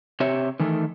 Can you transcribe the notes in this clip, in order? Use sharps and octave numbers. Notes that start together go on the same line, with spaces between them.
C3 G4 C#5 E5
D#3 E3 A3